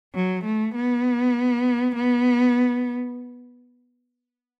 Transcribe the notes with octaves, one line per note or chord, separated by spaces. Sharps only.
F#3
A3
B3
B3